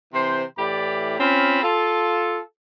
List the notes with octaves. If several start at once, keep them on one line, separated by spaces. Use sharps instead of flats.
C3 E3 C5
A2 E3 G4 D5 B5
C4 C#4 F4 B5
F4 A4